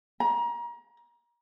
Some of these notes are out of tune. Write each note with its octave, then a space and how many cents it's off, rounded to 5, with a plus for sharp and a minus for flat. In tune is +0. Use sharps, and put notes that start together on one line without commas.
A#5 +30